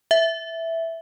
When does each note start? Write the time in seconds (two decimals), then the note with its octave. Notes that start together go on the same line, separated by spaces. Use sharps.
0.11 E5